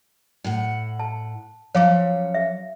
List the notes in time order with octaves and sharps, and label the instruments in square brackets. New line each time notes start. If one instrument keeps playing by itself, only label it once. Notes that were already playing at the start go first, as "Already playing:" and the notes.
[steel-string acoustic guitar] A2 F#5
[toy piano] A5
[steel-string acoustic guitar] F3 F#3 C#4 [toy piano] C#5 F5 D6
[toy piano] E5